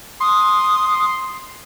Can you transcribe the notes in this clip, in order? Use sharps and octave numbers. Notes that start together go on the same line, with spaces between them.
C6 D#6